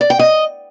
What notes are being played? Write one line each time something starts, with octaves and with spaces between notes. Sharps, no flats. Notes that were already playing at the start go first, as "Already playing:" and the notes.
D5
G5
D#5